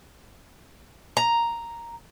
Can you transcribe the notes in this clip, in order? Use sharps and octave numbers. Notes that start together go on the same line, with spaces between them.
A#5